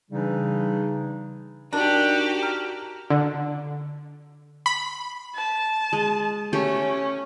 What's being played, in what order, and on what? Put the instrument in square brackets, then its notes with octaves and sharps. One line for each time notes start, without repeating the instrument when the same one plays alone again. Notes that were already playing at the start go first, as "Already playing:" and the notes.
[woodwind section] C#3 E3 G3 D4 D#4
[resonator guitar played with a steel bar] D4 [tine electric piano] D#4 A#4 A#5 [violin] F#4 G4
[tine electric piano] A#5 F6
[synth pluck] D3
B5
[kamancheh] A5
[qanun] G#3
[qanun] A3 G4 [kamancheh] C#4